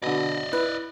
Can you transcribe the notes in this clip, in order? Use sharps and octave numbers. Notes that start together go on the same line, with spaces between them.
B2 D3 D5 D#5
E4 B4